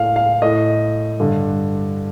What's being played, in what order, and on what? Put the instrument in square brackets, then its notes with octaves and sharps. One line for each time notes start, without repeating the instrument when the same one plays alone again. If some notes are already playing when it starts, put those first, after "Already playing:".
Already playing: [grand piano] A2 F5
F5
A2 D#5
G2 D3